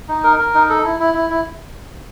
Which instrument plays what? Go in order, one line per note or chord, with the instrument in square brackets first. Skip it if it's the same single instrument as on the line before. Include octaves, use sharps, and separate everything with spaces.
[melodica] D#4
A#4
A#4
D#4
A4
E4
E4
E4
E4